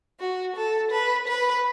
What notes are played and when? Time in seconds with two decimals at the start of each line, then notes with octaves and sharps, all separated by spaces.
0.20 F#4
0.56 A4
0.91 B4
1.28 B4